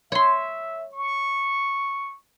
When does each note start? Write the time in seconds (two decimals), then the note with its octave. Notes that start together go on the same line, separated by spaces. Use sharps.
0.12 C#5 E5 C6
0.94 C#6